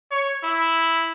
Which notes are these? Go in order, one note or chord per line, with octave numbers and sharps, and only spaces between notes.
C#5
E4